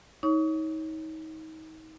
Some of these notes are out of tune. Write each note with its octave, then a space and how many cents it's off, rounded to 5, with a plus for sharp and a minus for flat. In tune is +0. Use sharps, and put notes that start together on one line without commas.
D#4 +30 C#5 +0 C#6 +35